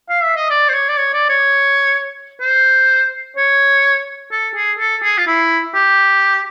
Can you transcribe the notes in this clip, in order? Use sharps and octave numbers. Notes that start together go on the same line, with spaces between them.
F5
E5
D#5
D5
C5
C#5
D5
C#5
D5
C#5
C5
C#5
A4
G#4
A4
G#4
F4
E4
G4